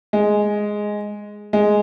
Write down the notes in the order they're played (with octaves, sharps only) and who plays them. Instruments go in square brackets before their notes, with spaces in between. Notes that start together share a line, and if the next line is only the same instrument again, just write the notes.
[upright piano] G#3
G#3